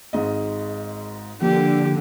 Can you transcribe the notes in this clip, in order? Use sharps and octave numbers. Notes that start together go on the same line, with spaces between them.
G#1 G#2 D#5
D3 F3 A#3 G4